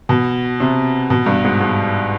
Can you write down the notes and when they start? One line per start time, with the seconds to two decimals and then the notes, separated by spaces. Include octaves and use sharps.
0.09 B2
0.60 C3
1.10 B2
1.26 G2
1.44 G#2
1.60 G#2